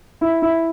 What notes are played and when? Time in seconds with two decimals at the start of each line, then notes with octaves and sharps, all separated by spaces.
0.21 E4
0.42 E4